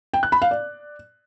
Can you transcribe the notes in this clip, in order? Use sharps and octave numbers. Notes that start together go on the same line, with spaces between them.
G5
F#6
B5
F5
D5